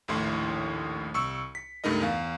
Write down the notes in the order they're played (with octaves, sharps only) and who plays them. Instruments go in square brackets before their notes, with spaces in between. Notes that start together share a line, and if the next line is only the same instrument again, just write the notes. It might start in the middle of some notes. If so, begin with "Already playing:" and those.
[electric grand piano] A#1 D#2 A2 E4 C6
C2 C#6 E6 C#7
B6
C#2 G2 A3 D#4 A#4 D#5
E2 F5